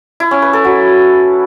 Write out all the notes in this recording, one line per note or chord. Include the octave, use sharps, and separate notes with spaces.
E4
C#4
B4
A4
F#3